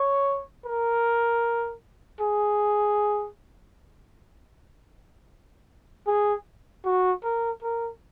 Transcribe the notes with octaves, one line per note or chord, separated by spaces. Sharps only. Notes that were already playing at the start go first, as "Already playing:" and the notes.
Already playing: C#5
A#4
G#4
G#4
F#4
A#4
A#4